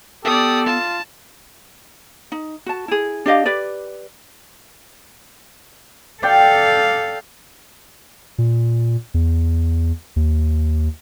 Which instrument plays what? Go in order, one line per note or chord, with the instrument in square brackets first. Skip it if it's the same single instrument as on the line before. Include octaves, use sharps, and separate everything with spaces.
[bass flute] B3 [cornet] G4 [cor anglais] A4 [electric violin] D5 D#6
[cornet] F4 [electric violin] A5
[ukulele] D#4
F#4 A5
E4 G#4
D4 G4 D#5 F5
G4 B4 D5
[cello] A4 F5 [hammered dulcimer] D5 G5
[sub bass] A#2
E2
D#2